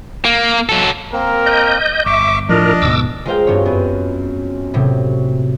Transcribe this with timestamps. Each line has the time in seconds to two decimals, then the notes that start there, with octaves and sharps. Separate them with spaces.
0.25 A#3
0.69 F#3 A4
1.13 A#3 C4 A#4
1.46 D#5 G6
2.06 G1 E5 C#6 D6
2.49 A2 F3 D4 A#4 D#5
2.82 D2 G#2 B2 D6 E6
3.25 G#3 F4 A#4 C5 F5 G5
3.47 G2 F#3 C4 C#5
3.66 F#2 B3
4.74 A2 C3 F#3